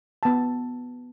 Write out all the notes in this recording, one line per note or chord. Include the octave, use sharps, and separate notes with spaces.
B3 A5